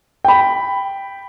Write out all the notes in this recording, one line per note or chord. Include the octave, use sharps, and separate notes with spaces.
G5 B5